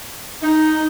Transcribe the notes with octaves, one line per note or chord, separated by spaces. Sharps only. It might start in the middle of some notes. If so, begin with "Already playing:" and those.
D#4